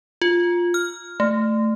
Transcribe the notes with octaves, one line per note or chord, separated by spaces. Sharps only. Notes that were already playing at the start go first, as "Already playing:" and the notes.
F4
F6
A3